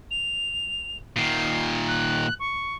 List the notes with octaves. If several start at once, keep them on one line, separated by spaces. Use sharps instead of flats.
F7
A#2 D#3 C7
F#6
C#6